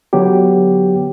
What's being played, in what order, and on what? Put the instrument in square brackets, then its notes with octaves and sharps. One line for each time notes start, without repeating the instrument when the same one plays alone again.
[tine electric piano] D3 F#3 B3 G4